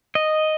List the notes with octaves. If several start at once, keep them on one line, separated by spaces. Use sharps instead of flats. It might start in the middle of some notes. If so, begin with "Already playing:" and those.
D#5